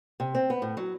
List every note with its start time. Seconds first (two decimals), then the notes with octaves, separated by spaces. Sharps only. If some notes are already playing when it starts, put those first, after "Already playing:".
0.20 C3
0.35 C4
0.50 B3
0.62 A2
0.77 F#3